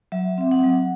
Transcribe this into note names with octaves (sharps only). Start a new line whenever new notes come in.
F#3 E5
C4 E5
F#5
F#3